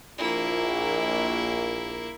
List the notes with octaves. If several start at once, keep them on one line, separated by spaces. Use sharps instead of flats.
A#1 A#3 E4